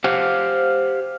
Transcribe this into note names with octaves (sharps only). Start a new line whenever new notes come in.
G4 C5 F5 F#5